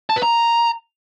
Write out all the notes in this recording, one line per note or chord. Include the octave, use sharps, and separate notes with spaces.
A5
B4
A#5